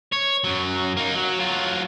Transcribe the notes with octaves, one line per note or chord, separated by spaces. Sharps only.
C#5
F#2 F#3
A#3 D#4
F#3
F#3 F4